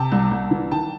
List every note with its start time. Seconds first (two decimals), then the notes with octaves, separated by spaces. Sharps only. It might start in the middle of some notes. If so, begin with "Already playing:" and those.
Already playing: C3 G5 A5
0.12 C2
0.31 C2
0.51 E3
0.71 D#3 G5 A5